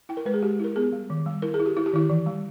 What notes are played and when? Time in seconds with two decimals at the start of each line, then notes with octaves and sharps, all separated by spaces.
0.09 E4 G5
0.17 A#4
0.25 G#3 B4
0.34 G#4
0.42 G#3 G4
0.60 E4 A#4
0.76 B3 G#4
0.92 G3
1.10 D#3
1.26 G3
1.42 E4 A#4
1.54 G#4
1.60 E4
1.66 G4
1.77 E4
1.86 G4
1.93 D#3 E4
2.10 E3
2.26 G3